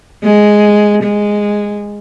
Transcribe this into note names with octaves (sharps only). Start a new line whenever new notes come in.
G#3
G#3